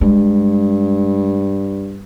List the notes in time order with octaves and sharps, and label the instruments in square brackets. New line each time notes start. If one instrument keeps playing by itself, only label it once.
[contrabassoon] G2 [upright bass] G#3